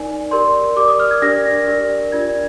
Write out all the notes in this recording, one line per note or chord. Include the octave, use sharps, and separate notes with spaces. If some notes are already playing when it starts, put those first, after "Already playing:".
Already playing: D#4 A#4 D5 G#5
G4 A#4 D5 C6
G4 A#4 D5 D6
D#6
F6
G#6
D4 G4 A#4 D5 A#6
D4 G4 A#4 D5
D4 F4 A#4 D5 G#6